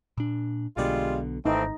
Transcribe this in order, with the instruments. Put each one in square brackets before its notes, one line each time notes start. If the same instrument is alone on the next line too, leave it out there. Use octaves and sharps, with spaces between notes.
[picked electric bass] A#2 D4
[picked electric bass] B1 B2 D3 [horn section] G3 G#3 F4
[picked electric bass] G#1 [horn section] E3 A3 C4 [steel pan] D#4